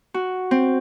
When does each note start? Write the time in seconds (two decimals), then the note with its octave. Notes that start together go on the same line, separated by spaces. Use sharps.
0.14 F#4
0.51 C4